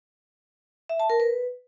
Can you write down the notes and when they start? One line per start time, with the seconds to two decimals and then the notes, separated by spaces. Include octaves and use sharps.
0.89 E5
1.00 A5
1.10 A#4
1.20 B4